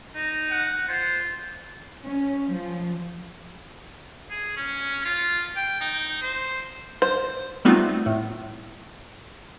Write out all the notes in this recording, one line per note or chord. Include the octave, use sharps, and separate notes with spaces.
D#4
F#5
F4 C5
C#4
F3
G#4
C#4
F4
G5
D#4
C5
C5
G3 A3 B3 C4 D#4 F4
A2